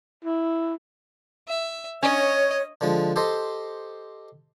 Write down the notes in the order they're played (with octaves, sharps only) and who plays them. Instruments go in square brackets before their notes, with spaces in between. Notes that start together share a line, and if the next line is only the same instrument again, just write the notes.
[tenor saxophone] E4
[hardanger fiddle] E5
[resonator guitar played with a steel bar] C#4 [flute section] C#5 [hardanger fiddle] D#5
[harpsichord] D3 F3 G#3
G4 A4 C5 D#5